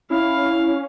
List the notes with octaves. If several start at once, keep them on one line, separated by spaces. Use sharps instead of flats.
C#4 E4 F5